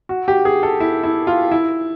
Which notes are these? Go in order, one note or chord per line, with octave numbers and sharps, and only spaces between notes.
F#4
G4
G#4
A4
E4
E4
F4
E4